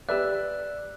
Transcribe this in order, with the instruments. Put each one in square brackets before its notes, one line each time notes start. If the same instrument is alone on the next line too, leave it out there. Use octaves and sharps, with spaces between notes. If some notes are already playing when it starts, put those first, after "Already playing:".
[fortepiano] G4 B4 E5 [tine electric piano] D5 E6 [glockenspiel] F#6